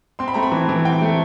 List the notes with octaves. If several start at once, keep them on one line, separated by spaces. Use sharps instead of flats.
C4 C6
B5
A3 A#5
B5
E3
E3
C4 G5
A3